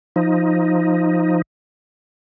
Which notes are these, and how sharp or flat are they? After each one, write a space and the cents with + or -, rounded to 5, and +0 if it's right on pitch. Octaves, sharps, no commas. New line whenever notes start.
F3 +0 D#4 +10